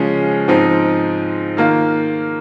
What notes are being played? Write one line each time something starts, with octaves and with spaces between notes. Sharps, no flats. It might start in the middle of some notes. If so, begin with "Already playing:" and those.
Already playing: C#3 F3 G#3 C#4
G#2 F3 C4 D#4
D#3 A#3 F4